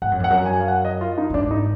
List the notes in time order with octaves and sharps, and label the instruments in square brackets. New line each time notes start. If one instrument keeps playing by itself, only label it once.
[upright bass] G#2 [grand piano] F#5
[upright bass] F#2
[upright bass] F2 [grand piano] F#5
[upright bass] F#2
[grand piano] G#5
F5
F#5
D#5
F4
D#4
[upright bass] F#2
[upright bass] G#2 [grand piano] D4
[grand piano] D#4